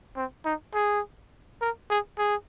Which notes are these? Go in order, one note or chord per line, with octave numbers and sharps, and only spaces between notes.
C4
D#4
G#4
A#4
G#4
G#4